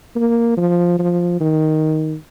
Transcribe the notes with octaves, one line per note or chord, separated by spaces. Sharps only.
A#3
F3
F3
D#3